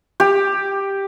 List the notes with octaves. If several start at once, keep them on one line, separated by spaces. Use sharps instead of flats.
G4